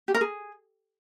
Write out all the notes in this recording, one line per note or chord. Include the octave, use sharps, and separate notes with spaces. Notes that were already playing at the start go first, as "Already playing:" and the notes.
G4
A#4
G#4